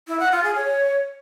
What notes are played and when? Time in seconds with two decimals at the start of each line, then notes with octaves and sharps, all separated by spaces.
0.08 E4
0.20 F#5
0.32 F4
0.44 G#4
0.56 C#5